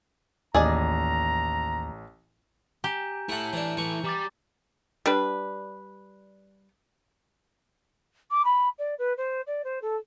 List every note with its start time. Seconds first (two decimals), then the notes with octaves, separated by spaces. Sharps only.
0.55 A1 D#2 G#4 D5 D#5 A#5
2.84 G4 G#5 A#5 G6
3.29 A3 E4 A4 F#5
3.53 E3 D4
3.77 E3 C#6
4.04 G3 A#5 D6 A6
5.06 G3 D4 B4
8.31 D6
8.45 B5
8.78 D5
8.98 B4
9.17 C5
9.47 D5
9.64 C5
9.82 A4